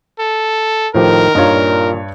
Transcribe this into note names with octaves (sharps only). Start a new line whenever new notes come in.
A4
A2 D#3 F3 G4 A#4
G2 A#2 D#4 F4 C#5